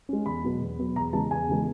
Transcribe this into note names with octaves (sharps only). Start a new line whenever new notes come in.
G#3 C#4
E2 B5
B2 F#3 B3
E2
B2 F#3 B3
E2 A#5
C#3 E3 G#3 B3 A5
E2 G#5
C#3 E3 G#3 B3